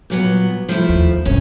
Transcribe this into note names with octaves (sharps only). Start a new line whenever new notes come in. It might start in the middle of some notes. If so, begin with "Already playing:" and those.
A#2 F#3 B3
F3 A3 E4
D#2
E1 G2 C#4